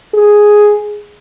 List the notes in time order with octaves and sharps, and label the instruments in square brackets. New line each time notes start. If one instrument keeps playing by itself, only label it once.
[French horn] G#4